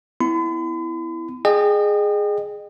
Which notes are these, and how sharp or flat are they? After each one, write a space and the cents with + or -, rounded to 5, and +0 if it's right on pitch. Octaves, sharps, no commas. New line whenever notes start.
B3 +35 E4 +0 B5 +45
G#4 +0 D#5 -35 G5 +0